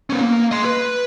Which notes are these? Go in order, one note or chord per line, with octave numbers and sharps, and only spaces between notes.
B3 C#4
A#3
D#5 C6
B4